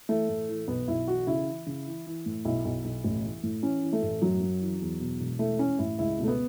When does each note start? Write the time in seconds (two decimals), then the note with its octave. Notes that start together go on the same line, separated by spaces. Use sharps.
0.09 E3 A3
0.29 A2
0.49 E3
0.68 B1 B3
0.88 B1 E4
1.08 E3 F#4
1.27 C#3 E4
1.46 E3
1.66 C#3
1.87 E3
2.06 E3
2.26 A2
2.45 B1 E4
2.65 B1
2.84 B1
3.04 A1
3.24 E3
3.43 A2
3.63 E3 C#4
3.82 E3
3.93 A3
4.02 A1
4.22 F#2 F#3
4.41 F#2
4.61 E3
4.81 E2
5.00 B2
5.20 E1
5.39 E3 A3
5.59 E3 C#4
5.79 A1 E4
5.99 C#2 E4
6.18 B2
6.24 A3
6.28 B3